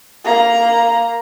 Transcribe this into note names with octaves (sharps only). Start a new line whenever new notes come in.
A#3 A#5